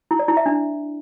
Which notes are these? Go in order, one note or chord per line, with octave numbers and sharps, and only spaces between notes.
E4
D5
E4
E5
D4